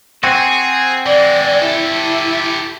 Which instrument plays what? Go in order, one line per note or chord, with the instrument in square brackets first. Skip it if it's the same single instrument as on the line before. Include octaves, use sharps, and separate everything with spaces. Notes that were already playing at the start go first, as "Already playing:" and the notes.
[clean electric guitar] C4 F#4 [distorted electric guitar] G#4
[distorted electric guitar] E3 G#3 [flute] D5
[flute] E4 [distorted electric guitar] G4 A4